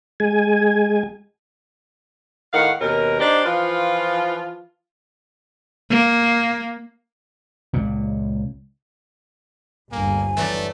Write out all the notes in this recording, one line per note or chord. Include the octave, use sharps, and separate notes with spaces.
G#3 G#5
A2 D#3 F5 F#5
D#2 B2 C#4 A#4
D4 D#4 G4 C5 D5
E3 F3 F4
A#3
C#2 A#2
G1 D2 G2 A#3 G#5
E3 F#3 A3 D5